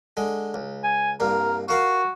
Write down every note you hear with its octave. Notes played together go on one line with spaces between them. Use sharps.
D3 G#3
C#2
G#5
C2 G2 A#3 A#4
F4 F#4 A#4 F5